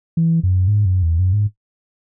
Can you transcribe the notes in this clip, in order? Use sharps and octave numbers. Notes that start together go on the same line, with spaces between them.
E3
F#2
G#2
F#2
E2
F#2
G#2